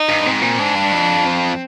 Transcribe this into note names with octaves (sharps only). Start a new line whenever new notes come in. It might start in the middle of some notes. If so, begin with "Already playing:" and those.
Already playing: D#4
G2
G#2 C4
A#2
G#2 D4
G2
F2
C4